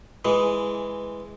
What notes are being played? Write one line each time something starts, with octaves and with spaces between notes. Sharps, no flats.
E3 G#3